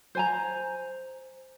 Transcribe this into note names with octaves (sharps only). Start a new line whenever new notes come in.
C5 G#5 A#5